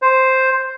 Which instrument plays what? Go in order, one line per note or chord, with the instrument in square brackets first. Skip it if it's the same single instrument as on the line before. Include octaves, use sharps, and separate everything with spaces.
[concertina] C5